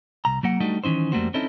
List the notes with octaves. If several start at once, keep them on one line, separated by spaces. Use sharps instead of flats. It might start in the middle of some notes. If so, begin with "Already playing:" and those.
C2 A#5
F#3 A#3 F#5
G3 A3 D4 D#4 F#4
D#3 E3 C#4 D#4 C5
F2 G3 A3 A#3 F#4 C5
C4 C#4 D#4 E4 A4